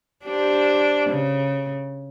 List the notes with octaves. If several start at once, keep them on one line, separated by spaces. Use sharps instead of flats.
D4 G4 C5
C#3